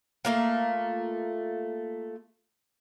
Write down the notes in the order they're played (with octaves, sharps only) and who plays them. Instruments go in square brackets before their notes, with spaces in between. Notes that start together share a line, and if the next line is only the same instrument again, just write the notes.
[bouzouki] A3 A#3 F4